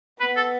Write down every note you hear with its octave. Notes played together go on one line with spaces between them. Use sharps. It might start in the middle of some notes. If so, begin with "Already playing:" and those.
B3 B4
A4